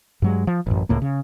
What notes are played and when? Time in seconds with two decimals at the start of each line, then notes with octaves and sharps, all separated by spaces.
0.22 G2 F#3 G#3
0.47 F3
0.66 A1 F#2
0.89 C#2 A2 A#3
1.02 C#3